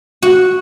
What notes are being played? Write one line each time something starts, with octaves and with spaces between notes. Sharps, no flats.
F#4